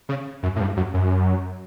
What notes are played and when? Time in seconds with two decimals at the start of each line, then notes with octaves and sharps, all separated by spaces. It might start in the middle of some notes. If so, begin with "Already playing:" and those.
0.09 C#3
0.43 F#2
0.56 A2
0.60 G2
0.77 F#2
0.94 F#2